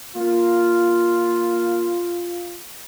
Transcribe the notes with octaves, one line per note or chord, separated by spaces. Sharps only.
A#3 F4